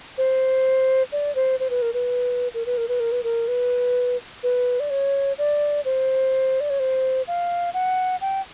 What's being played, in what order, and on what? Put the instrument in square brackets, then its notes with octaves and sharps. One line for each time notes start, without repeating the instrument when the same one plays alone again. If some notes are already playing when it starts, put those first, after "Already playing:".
[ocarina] C5
D5
C5
C5
B4
A#4
B4
A#4
B4
A#4
B4
A#4
B4
A#4
B4
B4
D5
C#5
D5
C5
D5
C#5
C5
F5
F#5
G5